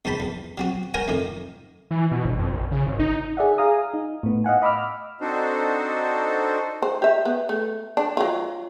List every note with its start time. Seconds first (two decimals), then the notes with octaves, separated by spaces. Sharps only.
0.05 E2 G#2 C5 A5 B5
0.20 E2
0.58 F#3 C4 F#4
0.94 A#4 C5 C#5 F#5 G#5 A#5
1.08 F2 A2 D#3
1.91 E3
2.11 B2
2.25 G1
2.39 F2
2.53 A#1
2.72 C#3
2.87 G#1
3.00 D#4
3.37 G#4 D5 E5 F#5
3.58 G#4 F5 G#5 A#5 D#6
3.94 D#4
4.23 A2 B3
4.44 D#5 F5 F#5 G#5
4.62 D#5 B5 D6 E6 F6
5.21 C4 D4 D#4 F#4 A4 C5
6.82 C5
7.02 G4 E5
7.25 B3
7.49 A3
7.97 D4
8.17 F#3 F4